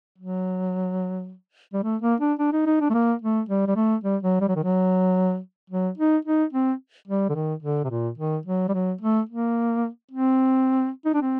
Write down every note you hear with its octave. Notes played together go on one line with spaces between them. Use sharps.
F#3
G3
A3
A#3
D4
D4
D#4
D#4
D4
A3
A#3
A3
G3
G3
A3
G3
F#3
G3
F#3
D#3
F#3
F#3
D#4
D#4
C4
G3
D3
D#3
D3
C3
A#2
D#3
F#3
G3
F#3
A3
A#3
C4
D#4
D4
C4